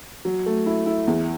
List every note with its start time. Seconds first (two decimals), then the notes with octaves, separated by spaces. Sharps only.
0.25 F#3
0.46 A3
0.66 E4
0.86 E4
1.07 E2